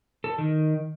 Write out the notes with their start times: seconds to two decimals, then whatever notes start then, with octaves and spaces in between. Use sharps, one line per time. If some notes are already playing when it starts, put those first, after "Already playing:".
0.24 A4
0.38 D#3